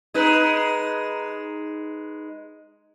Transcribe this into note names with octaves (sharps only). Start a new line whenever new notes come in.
G#3 D#4 B4